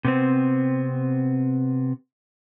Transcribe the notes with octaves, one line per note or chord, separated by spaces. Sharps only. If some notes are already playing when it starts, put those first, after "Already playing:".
C3 B3 C4